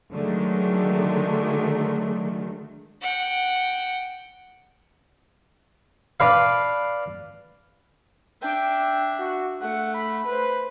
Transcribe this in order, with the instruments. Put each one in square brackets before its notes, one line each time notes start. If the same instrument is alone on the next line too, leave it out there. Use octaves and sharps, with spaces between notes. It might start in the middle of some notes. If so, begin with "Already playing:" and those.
[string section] D3 D#3 F#3 G#3 A3
[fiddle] F#5 G5
[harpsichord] D4 B4 F5
[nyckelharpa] D4 E5 [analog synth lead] G5
[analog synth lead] F#4
[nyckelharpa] A3 [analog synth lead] F#5
[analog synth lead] B5
[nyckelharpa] B4 C5